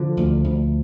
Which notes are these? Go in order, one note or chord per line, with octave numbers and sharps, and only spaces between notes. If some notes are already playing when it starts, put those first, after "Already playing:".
Already playing: D3 F3
D2
D2